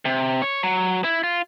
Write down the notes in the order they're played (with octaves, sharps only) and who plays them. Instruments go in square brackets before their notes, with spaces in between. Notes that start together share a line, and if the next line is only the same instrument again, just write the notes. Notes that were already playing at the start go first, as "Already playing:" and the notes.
[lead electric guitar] C3
C#5
F#3
E4
F4